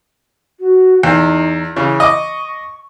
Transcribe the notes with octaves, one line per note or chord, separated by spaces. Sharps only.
F#4
E2 D#4
C#3 E3 C#6
D#5 D6